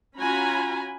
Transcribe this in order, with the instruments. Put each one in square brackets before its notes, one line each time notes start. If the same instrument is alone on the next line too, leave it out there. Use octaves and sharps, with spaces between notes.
[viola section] C#4 F4 F#4 G#5 A#5 B5